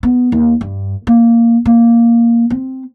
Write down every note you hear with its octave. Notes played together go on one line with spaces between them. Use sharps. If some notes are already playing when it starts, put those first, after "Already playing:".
B3
D#2
G2
A#3
A#3
C4